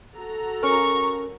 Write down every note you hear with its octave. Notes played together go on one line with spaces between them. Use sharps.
F#4 A4 A#5
C#4 A#4 C#6